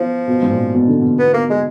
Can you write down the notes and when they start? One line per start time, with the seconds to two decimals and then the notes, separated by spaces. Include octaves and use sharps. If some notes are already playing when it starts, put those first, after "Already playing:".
Already playing: F3 B3
0.27 B2
0.42 G#2
0.51 A#2
0.74 B2
0.87 D3
1.02 B2
1.19 B3
1.34 A#3
1.50 G#3